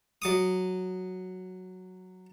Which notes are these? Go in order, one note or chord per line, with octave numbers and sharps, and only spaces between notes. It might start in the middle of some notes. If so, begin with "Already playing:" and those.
F#3 D6 D#6